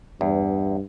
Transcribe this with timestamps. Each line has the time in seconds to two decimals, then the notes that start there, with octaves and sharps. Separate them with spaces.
0.21 E2 G2